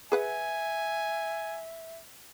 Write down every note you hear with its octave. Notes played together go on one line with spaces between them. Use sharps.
G#4 B4 E5 F#5 G#5